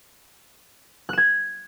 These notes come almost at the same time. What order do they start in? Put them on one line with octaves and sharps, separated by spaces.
F#6 E7 G#6